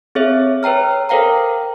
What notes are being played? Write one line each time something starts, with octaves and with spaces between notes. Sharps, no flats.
C4 G#4 A4 C#5 E5
B4 C#5 G5 A#5 F6
A4 A#4 C5 F5 G5 A#5